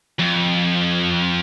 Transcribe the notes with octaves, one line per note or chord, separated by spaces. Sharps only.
F2